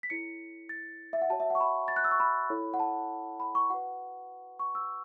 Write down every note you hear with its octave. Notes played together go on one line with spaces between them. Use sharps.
B6
E4 A4 C#5 C#7
A6
E5
F#5
F#4 C#5 A5
E5
F#5
C#6
B5
A6
F#6
E6
C#6
B5
E4 A4 C#5
F#5
A5
B5
C#6
F#4 B4 F#5
C#6
E6